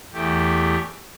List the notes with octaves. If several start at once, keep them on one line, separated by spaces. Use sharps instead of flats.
E2 A3 G4